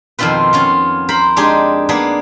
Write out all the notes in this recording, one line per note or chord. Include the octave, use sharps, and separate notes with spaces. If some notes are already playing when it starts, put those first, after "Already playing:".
F2 B2 D#3 C4 F4 B4
B3 C#4 F4
A#4 C5 B5
G#3 D4 D#4 G4 G#4
A#3 B3 D4 G#4 B4